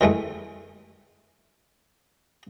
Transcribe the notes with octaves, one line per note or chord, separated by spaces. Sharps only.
D#3 E3 G#3 A3